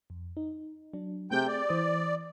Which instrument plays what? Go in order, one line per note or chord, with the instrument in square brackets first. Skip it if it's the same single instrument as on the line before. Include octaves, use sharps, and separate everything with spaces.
[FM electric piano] F2
D#4
F#3 D4
[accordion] C3 G5 G6 [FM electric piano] A3 C4 G#4
[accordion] D5
[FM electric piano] E3 C5 D#6